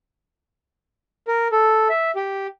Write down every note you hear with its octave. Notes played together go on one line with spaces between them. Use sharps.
A#4
A4
E5
G4